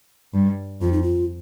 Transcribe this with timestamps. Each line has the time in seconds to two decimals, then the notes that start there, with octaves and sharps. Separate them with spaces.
0.34 G2
0.82 F2 F4
0.93 D#4
1.03 F4